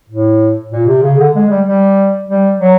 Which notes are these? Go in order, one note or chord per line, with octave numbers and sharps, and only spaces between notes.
A2
A#2
C3
C#3
D3
G#3
G3
G3
G3
F#3